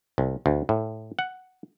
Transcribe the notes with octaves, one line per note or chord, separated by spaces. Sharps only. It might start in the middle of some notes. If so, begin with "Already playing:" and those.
C2
D2
A2
F#5